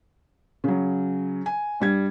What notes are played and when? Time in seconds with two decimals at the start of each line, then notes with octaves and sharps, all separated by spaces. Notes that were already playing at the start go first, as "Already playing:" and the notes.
0.64 C#3 F#3
1.46 G#5
1.80 G2 G3 G#6